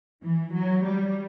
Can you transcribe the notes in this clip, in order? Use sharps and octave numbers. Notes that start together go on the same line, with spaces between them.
E3
F#3
G3